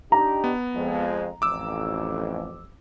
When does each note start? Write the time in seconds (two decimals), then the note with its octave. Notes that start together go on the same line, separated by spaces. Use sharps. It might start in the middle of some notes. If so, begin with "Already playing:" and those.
0.12 D4 D#4 G4 A#5
0.44 B3
0.75 F2 F3 G#3
1.42 A1 F2 D6 E6